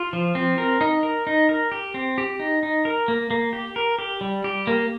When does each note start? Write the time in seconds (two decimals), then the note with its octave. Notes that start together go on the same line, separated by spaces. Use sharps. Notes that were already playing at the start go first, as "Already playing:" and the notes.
Already playing: F4
0.13 F3
0.35 C4
0.58 A#4
0.81 D#4
1.03 A#4
1.27 D#4
1.49 A#4
1.72 G4
1.94 C4
2.18 G4
2.40 D#4
2.63 D#4
2.85 A#4
3.08 A#3
3.31 A#3
3.53 G4
3.76 A#4
3.99 G4
4.21 G3
4.44 G4
4.67 A#3